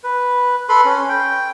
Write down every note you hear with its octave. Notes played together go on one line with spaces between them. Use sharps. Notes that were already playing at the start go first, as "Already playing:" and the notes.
B4
A4 B4 B5 C6
C#4
G5